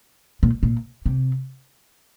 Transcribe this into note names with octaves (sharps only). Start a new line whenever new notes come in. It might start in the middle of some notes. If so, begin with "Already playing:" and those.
A#2
A#2
C3